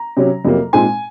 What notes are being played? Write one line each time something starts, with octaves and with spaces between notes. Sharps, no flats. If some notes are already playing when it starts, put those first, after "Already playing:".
Already playing: A#5
C3 F#3 C#4
F2 C3 F#3 A#3
A#2 G#3 C4 D#4 G#5